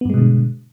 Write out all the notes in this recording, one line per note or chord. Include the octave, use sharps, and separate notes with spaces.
G2 B2 D3 G#3 B3